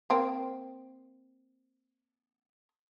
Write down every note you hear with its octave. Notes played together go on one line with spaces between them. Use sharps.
A#3 C4